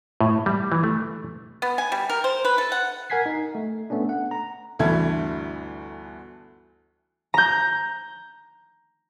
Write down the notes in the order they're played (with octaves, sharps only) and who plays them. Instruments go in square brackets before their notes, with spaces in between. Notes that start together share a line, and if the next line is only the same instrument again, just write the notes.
[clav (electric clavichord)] A2
G3
E3
A3
[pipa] B3
G#5
G3
A#4
C5
B4
A4
F#5
[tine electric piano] A#4 F#5 G#5 G#6 B6 C7
D#4
A3
A3 B3 C#4 D4
F#5
A#5
[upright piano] G1 D2 E3 A4 E5 G#6
[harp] A#5 G6